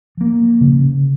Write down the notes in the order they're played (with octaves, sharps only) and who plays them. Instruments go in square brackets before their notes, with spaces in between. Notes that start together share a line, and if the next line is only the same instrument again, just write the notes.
[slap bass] F3 A#3
C#3